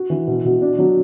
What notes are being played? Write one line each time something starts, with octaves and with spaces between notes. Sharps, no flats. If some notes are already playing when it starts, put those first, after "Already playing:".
Already playing: F#4
E3
B2
B2
D4
F#3